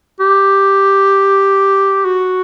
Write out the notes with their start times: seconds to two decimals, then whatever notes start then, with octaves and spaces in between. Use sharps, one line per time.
0.20 G4
2.05 F#4